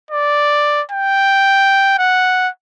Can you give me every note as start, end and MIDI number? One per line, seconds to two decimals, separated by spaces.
0.11 0.82 74
0.91 1.96 79
1.99 2.49 78